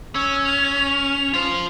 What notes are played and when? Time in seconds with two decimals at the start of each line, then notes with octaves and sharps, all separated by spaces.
0.15 C#4 E6
0.45 F7
1.34 F4 C5